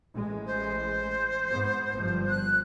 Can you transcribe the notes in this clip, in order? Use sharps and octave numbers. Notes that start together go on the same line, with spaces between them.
A1 G#3
C5
G#2 B3
G1 F3 G3
F#6